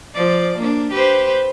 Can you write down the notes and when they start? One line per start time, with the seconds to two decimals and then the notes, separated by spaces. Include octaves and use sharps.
0.14 F3 D5
0.58 A#3 D4
0.92 G4 B4 C5